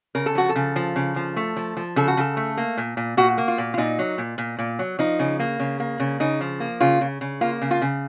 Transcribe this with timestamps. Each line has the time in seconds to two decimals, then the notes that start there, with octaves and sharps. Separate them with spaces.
0.15 C#3 A#4
0.26 A4
0.35 F3 F#4
0.49 A4
0.55 C#3
0.76 F3
0.96 C#3
1.16 F3
1.36 A3
1.56 F3
1.77 F3
1.96 C#3 A4
2.08 F#4
2.17 C#3 A4
2.37 A3
2.57 A#3
2.77 A#2
2.97 A#2
3.17 A#2 F#4
3.38 A#3
3.48 F4
3.58 A#2
3.74 F4
3.78 A#2 D#4
3.99 F#3
4.18 A#2
4.38 A#2
4.58 A#2
4.79 F#3
4.99 F3 D#4
5.19 C#3
5.39 A#3
5.59 C#3
5.80 A#3
6.00 C#3
6.20 C#3 D#4
6.41 F3
6.60 A#3
6.80 C#3 F4
7.01 C#3
7.21 C#3
7.41 A#3 F4
7.61 C#3
7.71 F4
7.82 C#3